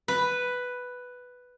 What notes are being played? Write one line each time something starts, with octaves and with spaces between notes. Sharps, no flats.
B4